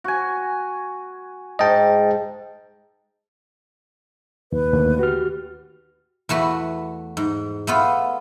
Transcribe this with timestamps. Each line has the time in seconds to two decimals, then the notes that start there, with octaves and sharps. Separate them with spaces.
0.04 F#4 G#5
1.59 G#2 D#5 G5 A5
4.52 D#2 B4
4.73 D#2 D3 A3
4.99 F#4 G4 F6
6.29 E2 A3 F#4 B4
7.17 G#2
7.67 A3 B3 F4